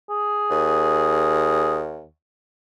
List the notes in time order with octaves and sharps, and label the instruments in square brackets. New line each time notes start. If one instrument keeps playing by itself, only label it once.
[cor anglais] G#4
[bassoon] D#2